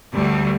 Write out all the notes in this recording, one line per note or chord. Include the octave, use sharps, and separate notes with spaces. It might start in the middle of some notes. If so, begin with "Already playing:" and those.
D2 D3 G3